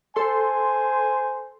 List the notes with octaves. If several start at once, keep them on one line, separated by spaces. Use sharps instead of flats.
A4 C5 G#5 C6